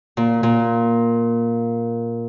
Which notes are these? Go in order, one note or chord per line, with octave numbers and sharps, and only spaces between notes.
A#2
A#2